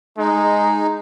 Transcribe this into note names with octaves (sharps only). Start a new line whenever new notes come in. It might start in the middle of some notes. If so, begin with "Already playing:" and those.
G#3 D#4